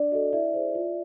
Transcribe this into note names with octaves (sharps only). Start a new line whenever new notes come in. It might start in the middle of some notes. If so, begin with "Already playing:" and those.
Already playing: D4 D5
F#4 A4 D#5
E4 D5 E5
G#4 C5
F4